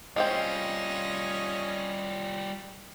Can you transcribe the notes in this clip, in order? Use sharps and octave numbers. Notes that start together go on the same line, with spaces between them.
G3 G#3 C4 C#4 F4 D#5 G5